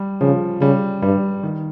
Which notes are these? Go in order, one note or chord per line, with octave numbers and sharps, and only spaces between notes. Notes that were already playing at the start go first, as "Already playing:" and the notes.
Already playing: G3
C#3 F3
C#3 G3
G2 G3
D#3